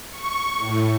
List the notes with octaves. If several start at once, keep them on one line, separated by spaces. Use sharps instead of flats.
C#6
A2